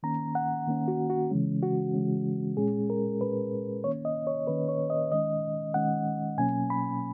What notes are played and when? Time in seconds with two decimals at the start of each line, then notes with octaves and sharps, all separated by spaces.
0.03 D#3 A#3 C#4 A#5
0.35 F#5
0.67 D#3 A#3 C#4
0.88 F#4
1.10 F#4
1.30 C#3 E3 G#3 C#4
1.63 F#4
1.94 C#3 E3 G#3 C#4
2.57 A#2 G#3 C#4 G#4
2.90 A#4
3.21 A#2 G#3 C#4 B4
3.84 D#3 A#3 C#4 C#5
4.05 D#5
4.27 C#5
4.47 D#3 A#3 C#4 B4
4.68 C#5
4.90 D#5
5.11 D#3 G#3 C#4 D#5
5.74 D#3 G#3 C#4 F#5
6.38 B2 F#3 A#3 C#4 G#5
6.70 B5